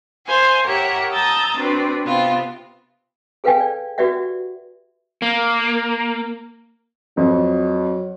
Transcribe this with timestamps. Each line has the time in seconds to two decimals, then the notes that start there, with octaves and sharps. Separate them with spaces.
0.25 C5 F5 G#5
0.64 G4 A#4 C#5 E5 F#5
1.10 A5 A#5 D#6 E6 G6 A6
1.55 C4 D4 F#4 B4
2.04 C3 B3 C4 F4
3.44 G#4 A4 B4 F5 G5 G#5
3.60 D5
3.98 F#4 G4 B4 D5 E5 F#5
5.22 A#3
7.17 F2 F#3